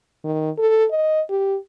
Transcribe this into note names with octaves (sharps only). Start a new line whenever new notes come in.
D#3
A4
D#5
G4